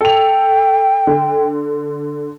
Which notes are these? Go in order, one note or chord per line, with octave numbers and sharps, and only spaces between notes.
A4 G5 F7
D3